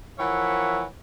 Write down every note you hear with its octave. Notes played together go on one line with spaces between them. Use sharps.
E3 F3 A#4 C#5 E5 F#5